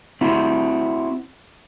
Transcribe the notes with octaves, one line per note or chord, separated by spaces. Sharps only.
C4 E4 F#4